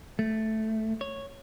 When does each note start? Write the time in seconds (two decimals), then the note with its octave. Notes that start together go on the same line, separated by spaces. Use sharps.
0.19 A3
1.01 C#5